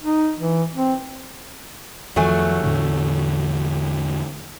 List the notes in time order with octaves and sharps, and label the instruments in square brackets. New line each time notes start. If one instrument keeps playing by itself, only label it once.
[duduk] D#4
E3
C4
[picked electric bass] F2 D#3 F3 [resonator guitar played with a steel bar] F#3 A3 G#5
[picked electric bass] E2 A2 D3